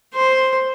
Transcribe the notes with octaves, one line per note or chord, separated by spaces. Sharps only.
C5